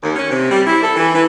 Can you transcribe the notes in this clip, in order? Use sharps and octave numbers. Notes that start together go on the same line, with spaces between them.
D#2
C#4
C3
G3
E4
A4
E3
E3